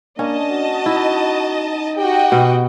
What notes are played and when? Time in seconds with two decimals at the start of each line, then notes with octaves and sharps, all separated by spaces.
0.19 A#3 C#4 D4 D#5 A5
0.50 F#4
0.86 D#4 E4
1.98 F#4 G4 D#5 G5
2.32 B2